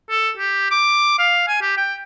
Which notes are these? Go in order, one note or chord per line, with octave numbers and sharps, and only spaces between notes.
A4
G4
D6
F5
G#5
G4
G5